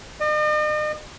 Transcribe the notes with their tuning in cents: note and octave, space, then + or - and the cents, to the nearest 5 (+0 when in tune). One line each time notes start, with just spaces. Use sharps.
D#5 -45